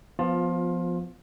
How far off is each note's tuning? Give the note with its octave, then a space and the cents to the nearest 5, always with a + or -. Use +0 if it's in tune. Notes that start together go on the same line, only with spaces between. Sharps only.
F3 +0 B3 +10 F4 +20